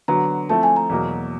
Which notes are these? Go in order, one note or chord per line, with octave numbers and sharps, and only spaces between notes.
D3 F#3 B3 A#5
F3 A3 C4 E4 A5
G#5
A#5
E2 B2 F#3 A#3